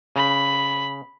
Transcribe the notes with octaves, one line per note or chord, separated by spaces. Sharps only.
C#3 B5